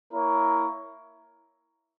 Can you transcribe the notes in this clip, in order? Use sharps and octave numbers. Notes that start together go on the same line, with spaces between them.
A#3 E4 A#4 C#5